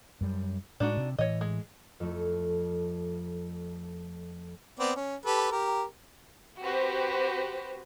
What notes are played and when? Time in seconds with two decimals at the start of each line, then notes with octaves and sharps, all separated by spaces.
0.21 F#2 G3
0.80 A2 G#3 D4 D#4 F#4
0.97 C3
1.18 A2 E3 C#5 D#5
1.41 G#3
2.00 F2 A3
4.79 B3 C4 D5
4.96 C#4
5.25 G4 A4 B4
5.52 G4 A#4
6.62 C4 F#4 G4 B4 C5